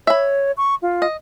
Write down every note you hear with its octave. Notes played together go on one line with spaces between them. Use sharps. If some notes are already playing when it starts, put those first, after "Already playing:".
C#5 E5 B5
C#6
F4
D#5